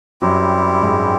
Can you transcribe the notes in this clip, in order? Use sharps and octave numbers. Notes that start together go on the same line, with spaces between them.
F#2 F#3 G3 C4 E4 G4
G#2 G#3